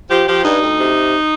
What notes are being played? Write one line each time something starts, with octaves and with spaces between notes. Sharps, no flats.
F3 G4
F3 G4
G2 D#4
D2
C3